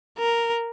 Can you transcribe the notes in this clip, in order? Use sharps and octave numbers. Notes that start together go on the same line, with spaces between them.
A#4